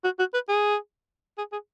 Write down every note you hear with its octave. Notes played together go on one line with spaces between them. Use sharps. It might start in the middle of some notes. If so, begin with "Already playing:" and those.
F#4
F#4
B4
G#4
G#4
G#4